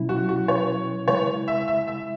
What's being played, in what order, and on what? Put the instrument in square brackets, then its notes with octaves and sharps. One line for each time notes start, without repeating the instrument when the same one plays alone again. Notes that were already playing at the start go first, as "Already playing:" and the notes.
Already playing: [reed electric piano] B2 F#3 C#4 E4
[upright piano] F#4
F#4
C#5
[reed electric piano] C#3 G#3 E4 [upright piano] C#5
[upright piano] E5
E5
E5